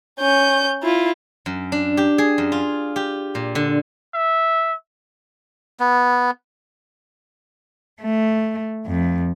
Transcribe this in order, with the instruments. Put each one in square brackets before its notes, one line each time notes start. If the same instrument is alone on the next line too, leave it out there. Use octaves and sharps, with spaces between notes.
[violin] C#4 G6
E4 F4
[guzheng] F#2
D4
G4
G#4
F#2
F4
G4
A#2
D3
[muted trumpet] E5
[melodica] B3
[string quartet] A3
F2